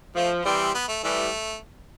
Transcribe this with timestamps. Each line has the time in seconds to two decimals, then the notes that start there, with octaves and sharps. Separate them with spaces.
0.16 F3 A3
0.45 E3 G3 C4
0.74 B3
0.88 A3
1.03 E3 G3 A3